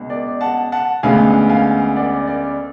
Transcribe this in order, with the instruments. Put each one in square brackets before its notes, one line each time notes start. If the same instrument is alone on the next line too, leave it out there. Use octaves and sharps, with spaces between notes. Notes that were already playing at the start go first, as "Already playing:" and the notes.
Already playing: [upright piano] C#2 B2 D4
D5
F#5 A5
F#5 A5
D2 C#3 G#3 B3 D4 F5 G#5
F5 G#5
D5 F#5
D5